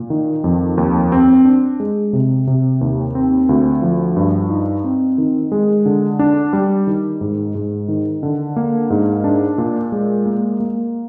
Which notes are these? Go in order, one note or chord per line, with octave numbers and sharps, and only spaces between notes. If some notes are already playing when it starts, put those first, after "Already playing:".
Already playing: A#2
D#3
F2
D#2
C4
D4
G#3
C3
C3
D#2
C4
D2
F3
G2
D#4
C4
D#3
G#3
D3
D4
G3
D#3
G#2
G#2
D#3
D3
A#3
G#2
D4
A#2
G#3
A#3
A#3